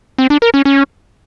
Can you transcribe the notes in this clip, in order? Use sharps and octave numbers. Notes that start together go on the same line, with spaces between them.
C4
D4
A#4
C#4
C#4